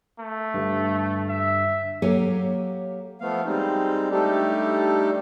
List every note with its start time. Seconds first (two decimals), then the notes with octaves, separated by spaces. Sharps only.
0.19 A3
0.54 G2 D3
1.29 E5
2.02 F#3 A#3 G4 A4 C#5 G#5
3.20 F3 A3 B3 F5
3.45 G3 G#3 C4 D#4
4.11 G3 A3 D4 D#4 G4 A4